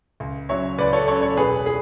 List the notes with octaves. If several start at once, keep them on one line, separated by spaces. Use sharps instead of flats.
C#2
C#3 F#3 C#5 E5
C#2 B4 D5
A4 C#5
C#3 F#3 A4 C#5
A4 C#5
E1 G#4 B4
G#4